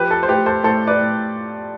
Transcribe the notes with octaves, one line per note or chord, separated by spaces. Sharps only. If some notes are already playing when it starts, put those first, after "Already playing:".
Already playing: F3 G4 B4
A4
C5
A2 G4 B4
A4 C5
A2 A4 C5
B4 D5
A2